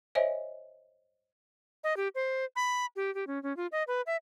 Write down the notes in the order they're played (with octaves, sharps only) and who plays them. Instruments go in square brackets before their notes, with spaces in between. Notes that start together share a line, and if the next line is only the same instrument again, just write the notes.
[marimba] C5 C#5 D#5 E5 G#5
[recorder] D#5
G4
C5
B5
G4
G4
C#4
C#4
F4
D#5
B4
E5